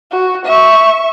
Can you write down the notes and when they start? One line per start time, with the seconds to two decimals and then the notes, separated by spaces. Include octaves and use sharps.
0.11 F#4
0.45 E5 C#6